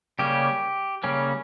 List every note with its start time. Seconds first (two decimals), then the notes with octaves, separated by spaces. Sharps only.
0.19 C#3 G3 A#3 C#4 G4
1.03 C#3 G3 A#3 C#4